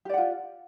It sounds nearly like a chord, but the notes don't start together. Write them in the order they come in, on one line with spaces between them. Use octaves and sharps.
G4 D5 F#5 F4